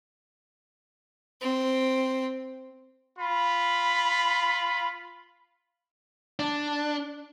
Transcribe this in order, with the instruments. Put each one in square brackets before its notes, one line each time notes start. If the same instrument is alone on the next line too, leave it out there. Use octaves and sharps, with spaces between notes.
[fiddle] C4
[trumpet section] F4 B5
[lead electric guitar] D4